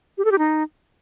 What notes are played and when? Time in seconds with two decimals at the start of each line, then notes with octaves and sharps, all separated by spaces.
0.18 G4
0.25 A4
0.32 G4
0.38 D#4